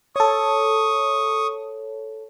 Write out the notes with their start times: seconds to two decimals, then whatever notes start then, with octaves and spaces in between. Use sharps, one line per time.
0.16 A4 C#5 C#6 D#6